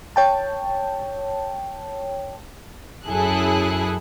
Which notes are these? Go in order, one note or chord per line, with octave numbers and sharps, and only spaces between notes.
C#5 G5 A5
F#2 E4 G#4 A4 F#6